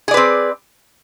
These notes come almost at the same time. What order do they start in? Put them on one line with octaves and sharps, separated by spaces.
G#4 D5 B4 C4